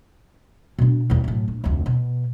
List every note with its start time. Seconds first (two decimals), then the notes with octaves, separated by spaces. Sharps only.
0.79 B2 D4
1.10 B1 E2
1.24 F#2 A2
1.48 A#1
1.64 F1 D2
1.86 B2